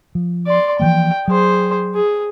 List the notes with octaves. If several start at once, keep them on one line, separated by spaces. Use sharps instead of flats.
F3
D5 C6
E3 F3 A#3 G5
F#3 G#4 C5
G#4